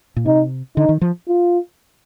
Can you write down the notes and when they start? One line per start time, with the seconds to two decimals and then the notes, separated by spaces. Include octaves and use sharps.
0.16 A#2
0.26 C3 D#4
0.76 D3 D#4
0.89 D#3
1.01 F3
1.28 F4